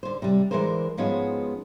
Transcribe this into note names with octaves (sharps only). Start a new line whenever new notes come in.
D3 C5
C3 G3
D3 E3 G#3 C4 A#4 C5
G#2 F3 G#3 B3 C#4 F#4